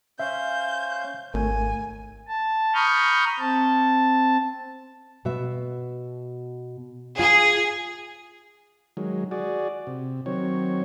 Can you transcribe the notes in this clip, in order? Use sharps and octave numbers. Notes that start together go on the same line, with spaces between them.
C#4 C5 E5 F5 G6
G#1 D#2 A3 A#4 G#5
A5
A#5 B5 C#6 D#6 F6 G6
C4 A5
B2 F#4 E5
F4 G#4
D#3 F#3 G#3
F#4 G#4 D5
C3
D#3 F#3 C4 C#5